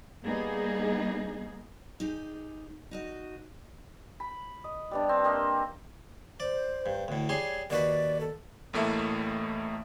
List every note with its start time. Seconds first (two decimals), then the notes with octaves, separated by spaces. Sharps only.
0.23 G3 A#3 B3 D#4 G#4
2.00 D#4 G4 G#4
2.91 D#4 F#4 D#5
4.20 B5
4.64 D#5
4.91 G3 B3 D4
5.09 C4
5.24 A#3 C4 D#5
6.40 C5 D5
6.86 G2
7.08 D2 A2
7.29 G3 G#4 C#5 C6
7.70 D#2 F#4 B4 D5
8.21 A4
8.73 A1 A2 A3 A#3 E4 E5